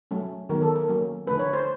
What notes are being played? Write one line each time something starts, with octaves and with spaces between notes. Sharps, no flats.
F#3 A3 C#4
D#3 F#3 B3 A#4
A4
A#4
F#3 A#3 C#4
D3 F3 A3 C#4 B4
C#5
C5